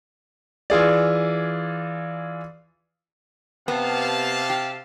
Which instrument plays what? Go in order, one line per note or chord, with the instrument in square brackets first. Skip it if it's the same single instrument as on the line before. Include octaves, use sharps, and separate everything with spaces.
[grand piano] E3 F4 G#4 D5
[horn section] C3 F5 A5 [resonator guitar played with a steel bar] B3
[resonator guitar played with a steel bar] G4